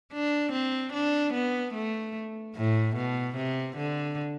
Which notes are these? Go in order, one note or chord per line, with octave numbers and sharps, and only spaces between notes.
D4
C4
D4
B3
A3
A2
B2
C3
D3